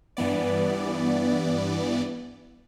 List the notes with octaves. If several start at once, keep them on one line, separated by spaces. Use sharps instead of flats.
G2 E3 B3 D5